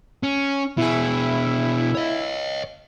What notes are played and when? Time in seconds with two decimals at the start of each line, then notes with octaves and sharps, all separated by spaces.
0.23 C#4
0.78 B2 E4 G#4
1.95 C#5 D#5